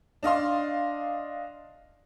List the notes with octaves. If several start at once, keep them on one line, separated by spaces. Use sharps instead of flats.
D4 D#5 F5 C6